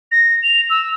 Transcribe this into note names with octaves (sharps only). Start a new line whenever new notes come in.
A#6
F7
E6